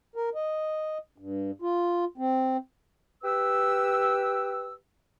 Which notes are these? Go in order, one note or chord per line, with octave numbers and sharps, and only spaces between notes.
A#4
D#5
G2
F4
C4
G4 B4 E6